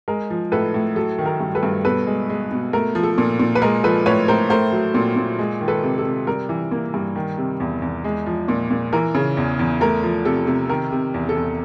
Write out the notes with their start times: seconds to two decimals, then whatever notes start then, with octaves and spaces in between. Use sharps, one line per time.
0.08 G#3 A#4
0.30 F3
0.52 A2 A4 B4
0.74 A2
0.96 F#3 A4
1.19 D#3
1.26 A#4
1.40 G2
1.55 A4 B4
1.63 G2
1.84 B2 A4 B4
2.07 G#3
2.30 G#3
2.51 B2
2.73 A3 A#4
2.95 F3
3.03 A4
3.18 A#2
3.39 A#2
3.55 B4
3.62 G#3 A#4
3.84 F3 A4 B4
4.06 A2 B4 C#5
4.28 A2 A#4 C5
4.50 A3 A#4 C5
4.72 F#3
4.94 A#2
5.16 A#2
5.39 G#3
5.61 D#3
5.68 A4 B4
5.83 C3
5.98 A4
6.05 C3
6.27 G3 A#4
6.49 E3
6.71 A#3
6.94 G2
7.16 D#3
7.38 C3
7.60 E2
7.82 E2
8.04 G#3
8.26 F3
8.48 A#2
8.70 A#2
8.93 E3 A#4
9.15 C#3
9.37 E2
9.59 E2
9.81 A3 A#4
10.03 F3
10.25 C3 A4
10.47 C3
10.69 D#3 A#4
10.92 C3
11.14 E2
11.29 A4
11.36 E2